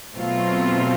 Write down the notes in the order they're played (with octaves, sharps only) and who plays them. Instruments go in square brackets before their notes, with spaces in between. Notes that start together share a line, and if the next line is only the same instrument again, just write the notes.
[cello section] B2 F#3 A3 C4 F4